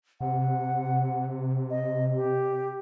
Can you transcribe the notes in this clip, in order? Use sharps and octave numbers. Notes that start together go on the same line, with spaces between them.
C3 F#5
D#5
G4